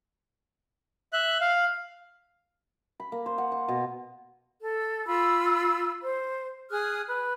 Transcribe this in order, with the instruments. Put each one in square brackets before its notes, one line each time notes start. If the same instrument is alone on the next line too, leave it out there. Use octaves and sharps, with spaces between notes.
[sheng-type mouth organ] E5 F#6
F5
[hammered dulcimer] B5
A#3
C5
F#5
F#5
B2
[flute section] A4
F4 B5 E6
C5
G#4 D#6 F6 F#6
B4